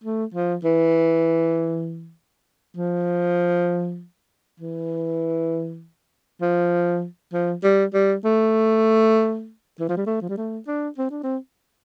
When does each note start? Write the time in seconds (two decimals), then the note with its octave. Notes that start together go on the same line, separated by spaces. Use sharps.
0.04 A3
0.34 F3
0.64 E3
2.77 F3
4.60 E3
6.42 F3
7.33 F3
7.63 G3
7.94 G3
8.24 A3
9.80 E3
9.89 F3
9.97 G3
10.06 A3
10.22 F3
10.29 G3
10.37 A3
10.67 D4
10.98 C4
11.10 D4
11.23 C4